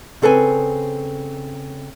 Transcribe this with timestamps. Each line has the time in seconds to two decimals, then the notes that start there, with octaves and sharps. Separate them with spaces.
0.22 C#3 C4 A4 B4 F#5 G#5